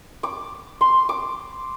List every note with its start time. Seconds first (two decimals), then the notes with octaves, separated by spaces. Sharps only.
0.23 D6
0.81 C6
1.09 D6